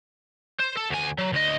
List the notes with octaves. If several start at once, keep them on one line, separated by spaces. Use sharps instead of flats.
C5
A4
D2 G#5
F#3
D2 D#5